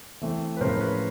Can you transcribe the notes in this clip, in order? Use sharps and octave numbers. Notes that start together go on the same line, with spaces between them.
E3 A3 C4
B4
A2 F3 G#3 C#4 A#4 C5
B4 C#5